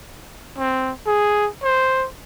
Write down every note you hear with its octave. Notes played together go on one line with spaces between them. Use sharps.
C4
G#4
C5